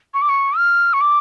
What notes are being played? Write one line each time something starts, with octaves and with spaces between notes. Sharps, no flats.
C#6
D6
C#6
F6
C#6
D6